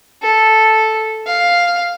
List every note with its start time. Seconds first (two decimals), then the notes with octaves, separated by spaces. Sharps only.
0.22 A4
1.27 F5